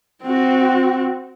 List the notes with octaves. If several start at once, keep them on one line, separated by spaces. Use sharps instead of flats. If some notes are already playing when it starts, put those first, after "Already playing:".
C4 F#4